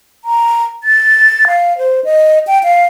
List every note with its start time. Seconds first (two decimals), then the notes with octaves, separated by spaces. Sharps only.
0.25 A#5
0.84 A6
1.48 F5
1.78 C5
2.05 D#5
2.47 G5
2.64 F5